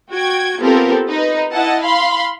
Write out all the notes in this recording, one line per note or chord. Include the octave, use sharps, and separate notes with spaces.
F#4 G5 G#6
B3 C4 F4 G4 A4 A#4
D#4 B4
E4 D#5 F#5 A5
F5 B5 C6